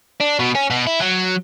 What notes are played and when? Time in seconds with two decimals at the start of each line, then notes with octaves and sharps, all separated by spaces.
0.20 D4
0.39 B2
0.55 C#4
0.70 B2
0.87 E4
1.00 F#3